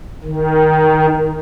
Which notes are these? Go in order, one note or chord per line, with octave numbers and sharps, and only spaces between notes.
D#3